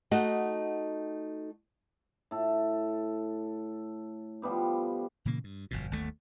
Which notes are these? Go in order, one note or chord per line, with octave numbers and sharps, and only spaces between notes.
A3 D#4 F#4 D#5 F#5
A2 A4
F3 G3 B3 G4
A#2 C#3 E3 A#3
G2
G1 F2 B2
G1 D#2 A#2 A3